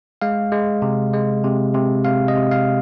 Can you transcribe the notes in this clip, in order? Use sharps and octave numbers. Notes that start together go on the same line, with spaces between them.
G#3 F5
G#3
C3
G#3
C3
C3
C3 F5
D#5
C3
F5